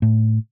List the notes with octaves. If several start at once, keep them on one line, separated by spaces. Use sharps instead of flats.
A2